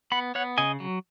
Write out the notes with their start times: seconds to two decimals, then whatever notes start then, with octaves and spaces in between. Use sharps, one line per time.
0.12 B3 F#5 B5
0.35 B3 C#5 F#5
0.58 C#3 D#5 G#5
0.80 F#3